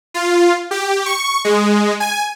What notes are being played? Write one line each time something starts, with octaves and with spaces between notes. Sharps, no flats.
F4
G4
C#6
G#3
G#5